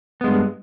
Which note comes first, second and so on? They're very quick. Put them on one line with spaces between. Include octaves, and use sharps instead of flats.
B3 G#3 G2